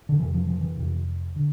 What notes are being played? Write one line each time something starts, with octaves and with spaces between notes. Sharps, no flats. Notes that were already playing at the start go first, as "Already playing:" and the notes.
D3
F2 C3 E3
F3
F3
E3
F2 C3
D3